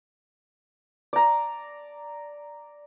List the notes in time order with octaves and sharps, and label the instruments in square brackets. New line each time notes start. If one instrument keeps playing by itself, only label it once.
[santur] D5 A#5